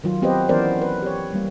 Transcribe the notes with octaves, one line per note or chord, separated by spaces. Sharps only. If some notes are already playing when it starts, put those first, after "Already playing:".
D#3 F#3 F4
B3 C4 G4 B4 C5 D#5
E3 B3 C#4 A#4 C5 D5
B4
G4 C#5
G3 A#3